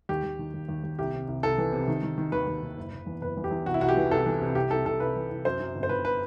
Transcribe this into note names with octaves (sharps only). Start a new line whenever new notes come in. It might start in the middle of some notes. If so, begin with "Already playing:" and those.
D#2 G4
D#2
D#3
D#2
D#2
D#2
C2 G4
C3
C2
C2 A4
E3
C3
D#3
D#3
D#3
D#2 B4
D#2
D#3
F#1
F#1
E2
F#1 B4
E2
G4
E2
C2 F#4
E4
C2 F#4
G4
E3
C2 A4
E3
C3
C2 G4
C2 A4
C2 A4
C2 B4
E3
C2
F#2 C5
F#2
G1
C5
G1 B4
B4